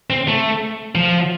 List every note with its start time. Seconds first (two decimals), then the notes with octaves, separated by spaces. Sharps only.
0.10 C4
0.28 A3
0.95 F3